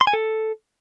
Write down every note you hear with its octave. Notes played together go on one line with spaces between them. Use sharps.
C6
G#5
A4